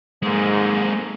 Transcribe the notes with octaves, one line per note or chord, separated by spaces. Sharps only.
G#2 G#3 A#3